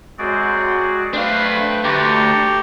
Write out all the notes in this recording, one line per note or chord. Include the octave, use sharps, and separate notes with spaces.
F#2 G#3 C4 F#4 G#4 D5
A3 D4 B4 C5 F5 G5
D2 G4 A5 A#5 C#6